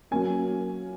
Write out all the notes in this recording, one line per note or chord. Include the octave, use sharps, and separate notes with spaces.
F#3 A#3 C#4 G#5